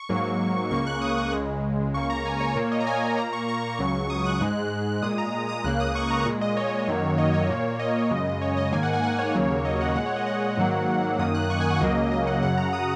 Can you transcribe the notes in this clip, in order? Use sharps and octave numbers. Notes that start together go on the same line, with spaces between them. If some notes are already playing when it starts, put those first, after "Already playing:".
Already playing: C#6
G#2 F#3 A#3
C#2 C#3 A#3 C#6
F#6
D#6
C#6
C#2 C#3 G#3
C#2 C#3 A#3 C#6
A#5
G#5
C#5
A#2 A#3 C#5
D#5
A#5
G#5
G#5
A#2 A#3 A#5
C#6
C#6
C#2 C#3 F#3
D#6
F#6
G#2 G#3
A#2 G#3 D#6
A#5
D#6
C#2 C#3 A#3 F#6
D#6
C#6
A#5
A#2 G#3
D#5
C#5
F#2 D#3 F#3 A#3
D#5
C#5
A#2 A#3
D#5
F#2 C#3 G#3
C#5
D#5
G#2 D#3 A#3 G#5
F#5
G#5
F#5
C#5
D#2 C#3 F#3 A#3
D#5
F#5
A#2 G#3 F#5
C#5
D#5
F#5
G#2 D#3 F#3 A#3
F#2 D#3 A#3 D#6
F#6
C#6
G#5
F#5
C#2 C#3 F#3 A#3 D#5
D#5
F#5
F#2 C#3 F#3 F#5
A#5
D#6